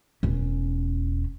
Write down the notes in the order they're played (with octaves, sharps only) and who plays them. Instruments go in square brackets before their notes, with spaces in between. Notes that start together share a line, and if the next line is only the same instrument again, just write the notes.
[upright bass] E1 C#4